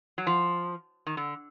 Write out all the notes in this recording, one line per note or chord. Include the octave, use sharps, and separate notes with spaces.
F#3
F3
D#3
D3